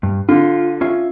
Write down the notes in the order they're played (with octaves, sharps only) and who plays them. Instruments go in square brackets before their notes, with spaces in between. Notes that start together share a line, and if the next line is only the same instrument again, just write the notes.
[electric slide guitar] G2
[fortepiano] D3 [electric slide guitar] F4
[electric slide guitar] C#4 F4 E5